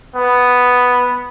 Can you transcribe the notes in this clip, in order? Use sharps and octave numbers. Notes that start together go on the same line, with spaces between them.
B3